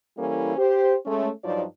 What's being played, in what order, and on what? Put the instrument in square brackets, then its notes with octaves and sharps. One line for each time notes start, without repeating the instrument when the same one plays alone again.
[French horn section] E3 G3 A#3 C#4 E4 A4
G4 C5
G#3 A3 C#4
G2 F3 F#3 D#4 D5